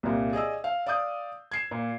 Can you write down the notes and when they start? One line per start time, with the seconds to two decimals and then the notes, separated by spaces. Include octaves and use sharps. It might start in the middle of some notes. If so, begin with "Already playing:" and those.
0.03 C2 A#2
0.33 G#4 D5 D#5 E6
0.64 F5
0.86 D5 F5 D6 D#6 G6
1.52 G#6 C7 E7
1.71 A#2